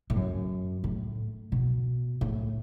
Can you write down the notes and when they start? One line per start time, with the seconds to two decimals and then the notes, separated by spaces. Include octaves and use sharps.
0.10 A2
0.16 F#2
0.84 A2
1.52 B2
2.21 A2